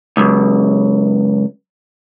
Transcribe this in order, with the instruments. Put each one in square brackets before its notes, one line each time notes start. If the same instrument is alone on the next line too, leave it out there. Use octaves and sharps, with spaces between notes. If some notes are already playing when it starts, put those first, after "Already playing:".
[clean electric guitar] C#2 F#2